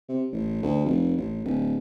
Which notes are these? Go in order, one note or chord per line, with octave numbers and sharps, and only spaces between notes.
C3
A1
D2
F1
A1
D1